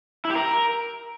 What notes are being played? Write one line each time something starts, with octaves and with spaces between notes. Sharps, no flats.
E4
G4
A#4